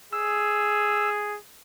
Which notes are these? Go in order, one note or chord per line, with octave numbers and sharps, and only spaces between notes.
G#4 E6